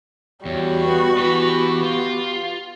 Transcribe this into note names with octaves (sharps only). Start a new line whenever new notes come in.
E2 G3 F#4 C#5
B3
E3 B3 G4 B4
F4